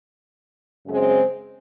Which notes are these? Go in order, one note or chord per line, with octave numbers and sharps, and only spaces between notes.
F#2 C#3 G#3 C4